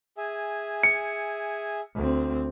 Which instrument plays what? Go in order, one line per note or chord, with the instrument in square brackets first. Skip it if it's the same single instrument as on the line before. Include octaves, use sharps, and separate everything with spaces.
[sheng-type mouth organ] G#4 E5 G#5
[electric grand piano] C#7
[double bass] D2 C4